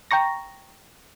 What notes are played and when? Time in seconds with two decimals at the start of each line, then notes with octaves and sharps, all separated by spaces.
0.11 G5 A#5 C#6 A#6